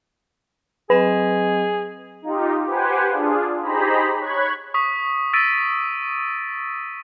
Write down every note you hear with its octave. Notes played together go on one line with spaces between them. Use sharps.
F#3 C4 G#4 B4 D#5
D#4 F4 G4
G4 B4 C5 F#5 G#5
D4 F4 G#4
D#4 G4 G#4 C5 A#5 B5
C#5 B5 F#6 G#6
C#6 D#6 B6
E6 A6 B6 D7 D#7